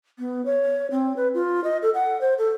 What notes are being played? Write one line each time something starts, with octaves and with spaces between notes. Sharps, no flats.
B3
C#5
C4
B4
F4
D#5
A4
F#5
C5
A4